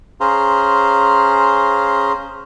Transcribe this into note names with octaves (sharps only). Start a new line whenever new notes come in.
C#4 G#4 C5 F5 A#5 C6